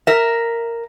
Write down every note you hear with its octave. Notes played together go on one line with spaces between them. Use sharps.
A#4 E5